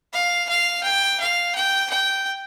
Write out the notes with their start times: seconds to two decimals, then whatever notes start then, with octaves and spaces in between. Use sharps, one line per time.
0.13 F5
0.49 F5
0.84 G5
1.20 F5
1.55 G5
1.90 G5